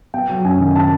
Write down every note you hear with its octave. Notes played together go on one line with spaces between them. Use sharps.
B3 G5
F#3
F#2 G#5
D#3
A5